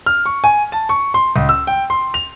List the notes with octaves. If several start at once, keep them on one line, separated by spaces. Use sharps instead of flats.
F6
C#6
G#5
A5
C#6
C6
C#2
E6
G5
C6
F7